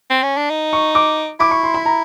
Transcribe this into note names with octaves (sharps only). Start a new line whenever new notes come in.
C4
C#4
D4
D#4
C#6
D6
E4 D6
C#6
C6
B5
A#5